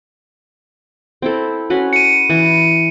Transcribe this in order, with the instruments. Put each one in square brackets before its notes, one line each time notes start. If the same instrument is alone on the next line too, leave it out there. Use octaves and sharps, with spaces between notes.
[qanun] C4 E4 A4
C#4 F#4 B4
[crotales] C#7 D#7
[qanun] E3